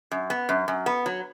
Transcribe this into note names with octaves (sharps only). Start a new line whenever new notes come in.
F#2
B3
F#2
F#2
B3
F#3